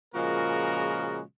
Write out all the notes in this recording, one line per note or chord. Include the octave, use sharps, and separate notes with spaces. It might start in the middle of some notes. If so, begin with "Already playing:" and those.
A#2 C#3 F3 G#3 F#4 A#4